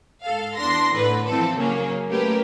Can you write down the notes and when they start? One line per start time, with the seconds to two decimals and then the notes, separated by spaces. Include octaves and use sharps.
0.22 G#2 A4 F5
0.56 E2 D4 C6 A#6
0.95 A2 D3 B4
1.28 E3 F3 C4 A4
1.58 C#3 F#3 A#3 C#4
2.09 A3 A#3 C#4 G4 A#4 B4